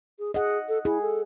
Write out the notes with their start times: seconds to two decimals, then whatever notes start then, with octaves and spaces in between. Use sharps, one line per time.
0.19 G#4
0.34 G#4 D#5 F#5
0.69 A4
0.85 E4 G#4
1.02 A4